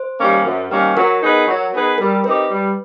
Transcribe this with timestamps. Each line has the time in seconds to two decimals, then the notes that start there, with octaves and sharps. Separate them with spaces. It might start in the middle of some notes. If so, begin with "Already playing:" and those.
Already playing: C5
0.19 D#3 G3 A#3 C#4
0.44 F#2
0.70 D#3 G3 A#3 C#4
0.96 F#3 A#4
1.22 B3 D#4 G#4 B4
1.47 F#3
1.73 B3 D#4 G#4 B4
1.98 G3 A#4
2.24 C4 D#4 G4 B4
2.50 G3